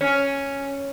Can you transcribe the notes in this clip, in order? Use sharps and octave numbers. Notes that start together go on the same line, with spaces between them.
C#4